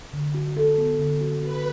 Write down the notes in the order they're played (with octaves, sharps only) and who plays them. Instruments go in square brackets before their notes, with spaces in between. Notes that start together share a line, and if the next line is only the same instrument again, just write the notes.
[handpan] D3
F#4
A4
B3
D3
F#4
[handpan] F#4 [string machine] B4